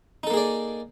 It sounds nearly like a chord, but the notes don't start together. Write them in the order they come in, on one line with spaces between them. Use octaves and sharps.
D#4 A4 A#3 G#4 D5